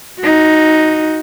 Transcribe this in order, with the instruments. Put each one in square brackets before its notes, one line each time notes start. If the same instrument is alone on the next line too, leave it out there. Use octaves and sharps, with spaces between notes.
[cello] D#4 F#4